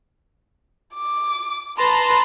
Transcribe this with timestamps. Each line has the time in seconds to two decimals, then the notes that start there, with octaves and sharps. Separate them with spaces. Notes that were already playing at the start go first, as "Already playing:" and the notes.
0.95 D6
1.78 B4 A5 A#5 C6